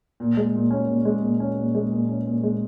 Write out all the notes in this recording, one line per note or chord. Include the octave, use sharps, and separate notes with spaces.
A#2
G#3
A#2
C#4
A#2
G#3
A#2
C#4
A#2
G#3
A#2
C#4
A#2
G#3